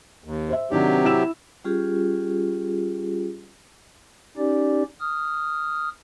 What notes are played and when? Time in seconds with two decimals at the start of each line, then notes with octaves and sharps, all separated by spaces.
0.24 D#2
0.49 C5 E5
0.71 C3 D#3 F#3 C4 D4 G4
1.05 E4 E6 E7
1.64 G3 C#4 F4 G4 G#4
4.37 C#4 D#4 G4 D5
5.00 D#6 F6